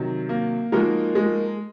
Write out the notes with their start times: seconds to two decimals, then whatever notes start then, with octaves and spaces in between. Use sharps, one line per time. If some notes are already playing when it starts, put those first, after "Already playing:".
Already playing: C3 D#3 F#3
0.29 A#3
0.72 F3 G#3 A#3 D#4 F#4 A#4
1.15 G#3